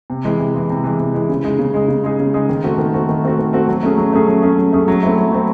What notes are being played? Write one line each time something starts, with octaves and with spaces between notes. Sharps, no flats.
C3
E3 G#3
C3
E3 G#3
C3
E3 G#3
C3
E3 G#3
C#3
G#3 D#4 G#4
C#3
G#3 D#4 G#4
C#3
G#3 D#4 G#4
C#3
G#3 D#4 G#4
D#3
A3 C4 F#4
D#3
A3 C4 F#4
D#3
A3 C4 F#4
D#3
A3 C4 F#4
F#3
A3 C#4 G#4
F#3
A3 C#4 G#4
F#3
A3 C#4 G#4
F#3
A3 C#4 G#4
F#3
A3 C4 E4
F#3
A3 C4 E4